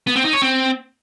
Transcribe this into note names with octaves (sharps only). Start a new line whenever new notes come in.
B3
C4
D#4
C#5
C4